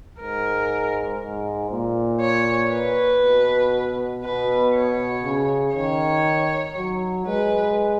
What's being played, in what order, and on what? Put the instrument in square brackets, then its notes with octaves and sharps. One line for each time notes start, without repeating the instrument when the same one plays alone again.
[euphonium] G#2 [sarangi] A#4
[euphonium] G#2
A#2
[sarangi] C#5
B4
[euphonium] B2
[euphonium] B2 [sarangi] B4
[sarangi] C#5
[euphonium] C#3
[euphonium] D#3 [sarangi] C#5
[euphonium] F#3
[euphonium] G#3 [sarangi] B4